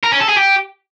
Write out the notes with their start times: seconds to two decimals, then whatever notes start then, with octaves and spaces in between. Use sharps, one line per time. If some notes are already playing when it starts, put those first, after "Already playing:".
0.04 A#4
0.12 C#4
0.20 A4
0.29 G#4
0.37 G4